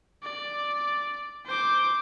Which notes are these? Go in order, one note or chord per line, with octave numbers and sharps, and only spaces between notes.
D5
C5 D6